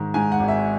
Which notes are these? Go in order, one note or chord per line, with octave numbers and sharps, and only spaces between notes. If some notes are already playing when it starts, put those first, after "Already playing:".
Already playing: G#2 D#3
G#2 G#5
F#5
G#1
E5